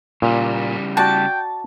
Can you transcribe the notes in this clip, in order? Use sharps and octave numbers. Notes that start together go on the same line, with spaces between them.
A#2 C#3 G3
F#4 D5 F#5 G5 A5